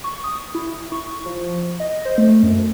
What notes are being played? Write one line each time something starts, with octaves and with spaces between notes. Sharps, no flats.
C#6
D#6
E4
C#6
F3
D#5
C5
A3
F#2